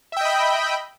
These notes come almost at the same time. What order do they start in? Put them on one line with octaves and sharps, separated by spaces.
E5 G5 D#5 B5